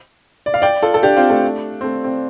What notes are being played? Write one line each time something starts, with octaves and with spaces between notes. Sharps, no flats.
D5
F5
D5 G5
F4 A4
A4
D4 G4
C4 F4
A3 D4
C4
A3
C4